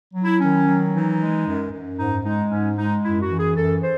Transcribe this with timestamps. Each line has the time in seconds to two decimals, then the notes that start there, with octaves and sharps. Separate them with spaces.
0.14 F#3
0.23 E4
0.40 D#3 C#4
0.67 F#3
0.93 E3 D#4
1.19 G#3
1.46 F#2
1.71 F#2
1.98 G#2 D#4
2.24 G#3 D#4
2.51 G#2 C#4
2.77 G#3 D#4
3.03 F#2 E4
3.21 F#4
3.30 E3
3.38 G#4
3.56 F#2 A4
3.82 C5